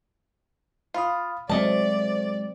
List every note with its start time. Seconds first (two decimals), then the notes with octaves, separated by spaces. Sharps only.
0.94 F4 F5 B5 D#6
1.49 F#3 G#3 A3 C4 D5 D#5 A5